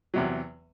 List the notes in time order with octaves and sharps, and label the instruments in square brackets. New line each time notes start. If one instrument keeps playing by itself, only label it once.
[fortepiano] E2 C3 F#3